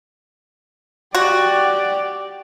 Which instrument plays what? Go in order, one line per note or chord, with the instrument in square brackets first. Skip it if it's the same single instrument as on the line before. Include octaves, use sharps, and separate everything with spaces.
[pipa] F#4 [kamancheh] G4 [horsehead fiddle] D5